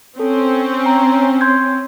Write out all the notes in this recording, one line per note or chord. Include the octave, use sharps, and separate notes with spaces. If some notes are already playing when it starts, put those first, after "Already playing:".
C4 C#4 A4
A#5
C6 G6 G#6